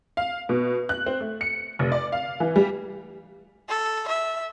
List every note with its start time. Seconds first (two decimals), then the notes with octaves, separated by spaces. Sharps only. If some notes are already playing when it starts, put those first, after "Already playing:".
0.17 F5
0.49 B2
0.89 F#6
1.06 C4
1.21 A3
1.41 C#7
1.79 F1
1.92 D5
2.12 F5
2.40 E3
2.56 G3
3.69 A4
4.08 E5